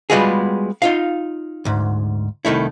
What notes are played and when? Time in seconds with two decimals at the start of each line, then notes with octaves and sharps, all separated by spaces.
0.10 G3 G#3 B3 F4 F#4 G#4
0.82 D#4 F4 F5
1.65 D2 G#2
2.45 C2 D#3 A3 E4